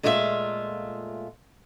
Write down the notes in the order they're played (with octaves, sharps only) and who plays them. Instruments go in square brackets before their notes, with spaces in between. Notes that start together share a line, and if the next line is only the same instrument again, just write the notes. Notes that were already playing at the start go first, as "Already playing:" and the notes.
[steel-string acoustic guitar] A#2 G#3 A3 F4 G4 E5